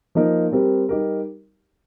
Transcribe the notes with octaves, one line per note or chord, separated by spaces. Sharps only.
F3 A#3 D#4 A#4
G3 C4 G4 A#4
G3 D#4 G4 A#4